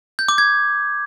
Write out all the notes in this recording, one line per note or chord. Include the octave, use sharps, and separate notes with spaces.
G6
D6
G#6